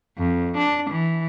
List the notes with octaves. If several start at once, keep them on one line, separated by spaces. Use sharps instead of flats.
F2
D4
E3